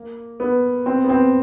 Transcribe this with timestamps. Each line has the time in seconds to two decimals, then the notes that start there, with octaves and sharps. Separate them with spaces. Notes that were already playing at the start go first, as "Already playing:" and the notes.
Already playing: A#3
0.40 B3
0.86 C4
1.04 B3
1.09 C4